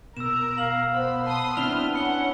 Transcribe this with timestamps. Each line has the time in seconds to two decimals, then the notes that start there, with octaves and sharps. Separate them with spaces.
0.17 B2 A#4 A#5 E6 E7
0.58 F5 F#7
0.92 B3 C5 B5
1.27 A5 B5 C6 D#6
1.57 C4 D4 E4 F6 F7 G7
1.94 C#4 F#5 B5 C#7 G7